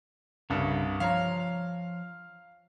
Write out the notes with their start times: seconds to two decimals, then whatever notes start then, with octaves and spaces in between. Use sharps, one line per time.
0.50 C2 G2 C#3
1.00 F3 C#5 F5 A#5